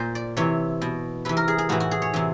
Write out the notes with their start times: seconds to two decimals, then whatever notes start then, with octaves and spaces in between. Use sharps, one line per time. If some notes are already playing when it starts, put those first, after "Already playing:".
Already playing: A#2 C5
0.15 D5
0.37 C3 E3 C#5
0.81 B2
1.25 C3 E3 B4
1.37 A#4
1.48 G#4
1.58 G#4
1.69 A2 E3 F#4
1.80 F#4
1.91 G#4
2.02 C#5
2.14 C3 E3